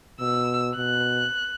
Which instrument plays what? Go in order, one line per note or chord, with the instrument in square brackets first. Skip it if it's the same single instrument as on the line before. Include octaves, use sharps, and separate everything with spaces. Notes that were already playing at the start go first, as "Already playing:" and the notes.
[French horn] B2 [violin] E6
[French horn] B2 [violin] F#6